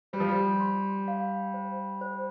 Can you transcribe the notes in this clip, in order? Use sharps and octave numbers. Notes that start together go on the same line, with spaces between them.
G3 C5
F3
G3
C6
F5
C5
C5